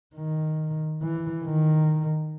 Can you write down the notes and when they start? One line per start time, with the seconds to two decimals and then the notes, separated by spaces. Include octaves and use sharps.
0.15 D#3
1.02 E3
1.45 D#3